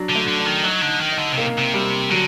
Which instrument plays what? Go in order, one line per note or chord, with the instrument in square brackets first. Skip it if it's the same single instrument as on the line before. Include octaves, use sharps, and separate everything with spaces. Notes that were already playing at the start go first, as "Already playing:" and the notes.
Already playing: [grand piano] F#3 D4
[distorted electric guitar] D3
[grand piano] A3
[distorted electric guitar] D3
[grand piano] D4
[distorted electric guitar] D#3
[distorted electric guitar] F#3 [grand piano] D#4
[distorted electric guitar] D3
[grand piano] D#4
[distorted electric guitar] D#3
[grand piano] D#4
[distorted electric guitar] D3
C3
[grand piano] A#3
[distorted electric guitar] C3
[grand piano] G3
[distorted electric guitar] D3 [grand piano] F#3